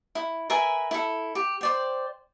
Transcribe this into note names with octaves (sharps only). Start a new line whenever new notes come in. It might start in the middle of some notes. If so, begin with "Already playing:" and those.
E4
A#4 B4 E5 G#5
E4 A4
G4
C5 D5 G5